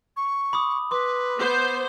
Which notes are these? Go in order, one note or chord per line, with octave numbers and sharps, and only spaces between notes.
C#6
B5 D6 D#6
B4 C6 D6
B3 C5